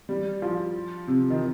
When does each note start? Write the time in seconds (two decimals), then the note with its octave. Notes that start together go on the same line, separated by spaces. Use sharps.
0.09 G3
0.42 F3
1.08 C3
1.30 D#3